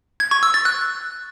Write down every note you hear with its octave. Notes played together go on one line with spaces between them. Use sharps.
G#6
C#6
E6
A6
F#6